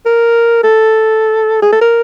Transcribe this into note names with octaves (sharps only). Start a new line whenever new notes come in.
A#4
A4
G#4
A4
A#4